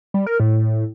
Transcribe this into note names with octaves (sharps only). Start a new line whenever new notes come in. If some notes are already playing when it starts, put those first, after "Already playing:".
G3
A#4
A2